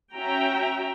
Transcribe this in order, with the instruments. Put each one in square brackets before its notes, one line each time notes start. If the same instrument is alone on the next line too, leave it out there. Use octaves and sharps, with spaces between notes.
[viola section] C#4 F#4 E5 G5 A#5